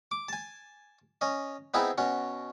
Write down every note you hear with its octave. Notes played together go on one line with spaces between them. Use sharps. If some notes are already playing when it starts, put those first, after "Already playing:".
D6
G#5 A5
C#4 D#5
B3 C4 D#4 E4 G#4 B4
B2 C#4 F#4